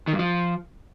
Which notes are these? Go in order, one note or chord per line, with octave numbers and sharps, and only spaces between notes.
D#3
G2
F3